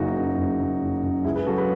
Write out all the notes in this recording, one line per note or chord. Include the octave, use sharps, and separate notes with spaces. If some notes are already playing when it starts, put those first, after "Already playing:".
Already playing: F#1 F#2 C#3 D#4 F#4
F#2 C#3
F#1
F#2 C#3
F#1
F#2 C#3
C#2 E4 G#4
G#4 B4
C#3 F#3 F#4 A4
G#4 B4